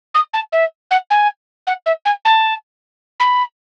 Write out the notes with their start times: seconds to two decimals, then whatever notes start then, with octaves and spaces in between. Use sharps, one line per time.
0.14 D#6
0.33 A5
0.52 E5
0.91 F#5
1.10 G#5
1.67 F#5
1.86 E5
2.05 G#5
2.25 A5
3.20 B5